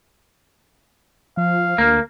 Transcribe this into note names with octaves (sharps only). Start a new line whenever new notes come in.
F3 F5
D2 A#3